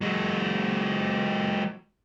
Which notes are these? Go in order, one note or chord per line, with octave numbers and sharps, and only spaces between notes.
F#3 G#3